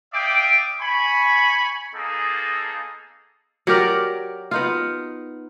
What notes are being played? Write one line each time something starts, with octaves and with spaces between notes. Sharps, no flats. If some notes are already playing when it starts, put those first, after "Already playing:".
D5 E5 F5 G5 D6 D#6
G#5 B5 C#6
A#3 B3 D#4 G#4 A4
F#3 G4 A#4 D5
B3 D#4 F4